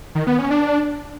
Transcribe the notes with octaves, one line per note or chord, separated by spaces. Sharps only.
D#3
B3
C#4
D4